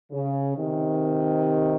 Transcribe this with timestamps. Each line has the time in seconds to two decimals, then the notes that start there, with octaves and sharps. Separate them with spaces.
0.11 C#3
0.57 C3 D#3